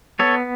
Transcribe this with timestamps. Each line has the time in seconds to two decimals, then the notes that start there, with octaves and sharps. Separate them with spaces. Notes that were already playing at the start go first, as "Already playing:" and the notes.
0.19 B3 A4 C#5